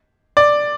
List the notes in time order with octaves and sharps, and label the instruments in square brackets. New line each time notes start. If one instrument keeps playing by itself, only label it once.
[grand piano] D5